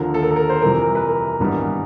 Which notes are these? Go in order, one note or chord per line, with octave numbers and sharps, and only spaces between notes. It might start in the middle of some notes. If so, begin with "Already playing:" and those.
Already playing: D#2 D3 F3 A#4
A4
A#4
A4
A#4
C5
F2 C3 E3 G3 A#4
A#4
B4
A#4
G#1 G2 E3 G3 B3